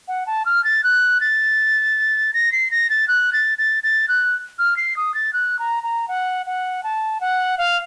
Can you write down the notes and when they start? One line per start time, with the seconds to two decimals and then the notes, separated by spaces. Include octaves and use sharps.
0.08 F#5
0.27 A5
0.46 F6
0.64 A6
0.84 F#6
1.21 A6
2.34 A#6
2.52 C7
2.71 A#6
2.90 A6
3.08 F#6
3.33 A6
3.58 A6
3.83 A6
4.09 F#6
4.59 F6
4.77 C7
4.97 D#6
5.14 A6
5.33 F#6
5.59 A#5
5.83 A#5
6.08 F#5
6.46 F#5
6.84 A5
7.21 F#5
7.58 F5